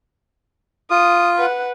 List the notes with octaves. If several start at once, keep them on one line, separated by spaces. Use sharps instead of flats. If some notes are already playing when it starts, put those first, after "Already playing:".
F4 D#6
B4 F#5